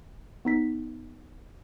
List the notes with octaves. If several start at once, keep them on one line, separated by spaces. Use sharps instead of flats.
B3 D#4 B6